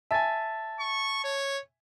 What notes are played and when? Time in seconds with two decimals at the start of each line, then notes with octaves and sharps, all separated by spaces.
0.11 E5 G#5 A5 A6
0.80 C#6
1.24 C#5